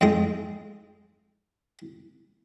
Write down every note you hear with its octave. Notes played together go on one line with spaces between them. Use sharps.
F2 G#2 G#3 G5 D#6